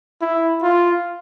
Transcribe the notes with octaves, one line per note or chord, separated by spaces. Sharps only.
E4
F4